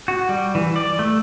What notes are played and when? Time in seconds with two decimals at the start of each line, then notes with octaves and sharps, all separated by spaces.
0.08 F#4
0.29 G3
0.55 E3
0.76 D5
0.99 A3